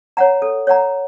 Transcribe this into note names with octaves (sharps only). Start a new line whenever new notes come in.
C#5 F#5 A#5
A4
C#5 F#5 A#5